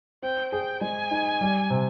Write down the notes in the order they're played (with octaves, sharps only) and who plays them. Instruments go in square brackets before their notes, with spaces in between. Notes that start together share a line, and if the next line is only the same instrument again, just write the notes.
[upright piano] C4 [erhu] G5
[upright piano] G#4 [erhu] G5
[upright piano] G#3 [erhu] G#5
[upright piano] D#4
G3
C3